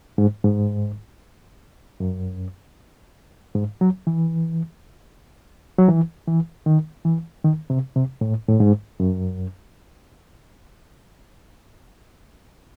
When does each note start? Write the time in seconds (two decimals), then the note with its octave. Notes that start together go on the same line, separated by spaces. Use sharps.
0.18 G#2
0.44 G#2
2.00 F#2
3.55 G#2
3.81 F#3
4.07 E3
5.78 F#3
5.88 E3
6.27 E3
6.66 D#3
7.05 E3
7.44 D#3
7.70 C3
7.96 C3
8.21 A2
8.49 A2
8.60 G#2
9.00 F#2